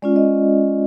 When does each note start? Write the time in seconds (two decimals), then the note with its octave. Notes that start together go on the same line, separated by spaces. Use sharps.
0.02 G#3 C#4 F4 D5
0.16 D#5